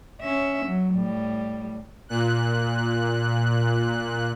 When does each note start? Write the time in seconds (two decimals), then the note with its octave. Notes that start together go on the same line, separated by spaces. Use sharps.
0.21 C#4 E5
0.65 F#3
0.94 A2 G3
2.09 A#2 F#6